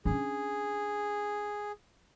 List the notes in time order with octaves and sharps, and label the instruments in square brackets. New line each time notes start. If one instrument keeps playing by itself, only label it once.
[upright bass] C#4 D4 [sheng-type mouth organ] G#4